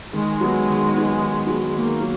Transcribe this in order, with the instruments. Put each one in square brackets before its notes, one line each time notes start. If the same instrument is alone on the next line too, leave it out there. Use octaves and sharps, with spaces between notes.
[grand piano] D#3 [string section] G#3
[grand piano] F#3 B3
D#3
F#3 B3
D#3
F#3 B3
[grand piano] D#3 [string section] A#3
[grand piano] F#3